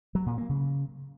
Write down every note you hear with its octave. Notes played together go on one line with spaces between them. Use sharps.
F#3
A#2
A#3
C#3